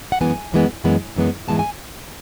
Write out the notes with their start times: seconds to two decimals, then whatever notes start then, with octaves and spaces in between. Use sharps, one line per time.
0.12 F#5
0.21 F#2 E3 G#3 B3 G#5
0.52 F#2 E3 G#3 B3
0.84 F#2 E3 G#3 B3
1.16 F#2 E3 G#3 B3
1.48 G#2 E3 G#3 B3 A5
1.59 G#5